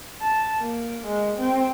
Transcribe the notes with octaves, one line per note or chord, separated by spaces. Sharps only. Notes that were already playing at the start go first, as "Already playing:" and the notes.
A5
A#3
G#3
C4